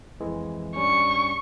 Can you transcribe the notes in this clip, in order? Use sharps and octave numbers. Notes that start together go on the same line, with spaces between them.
F2 E3 G#3
G2 G3 C#4 C#6